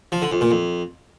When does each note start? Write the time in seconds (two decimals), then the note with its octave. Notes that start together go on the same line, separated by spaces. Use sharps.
0.12 F3
0.22 D3
0.32 F2
0.41 A#2
0.51 F2